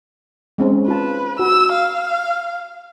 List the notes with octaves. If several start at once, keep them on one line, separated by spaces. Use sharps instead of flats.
G#3 C4 C#4
F4 B4 A5
F#4 E6
F5